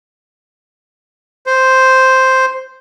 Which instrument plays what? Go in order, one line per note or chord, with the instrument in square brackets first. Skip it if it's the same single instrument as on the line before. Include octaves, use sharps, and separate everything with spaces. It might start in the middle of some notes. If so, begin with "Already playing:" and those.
[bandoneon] C5